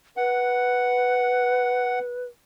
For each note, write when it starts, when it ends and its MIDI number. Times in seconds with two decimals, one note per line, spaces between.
0.17 2.24 71
0.17 1.99 78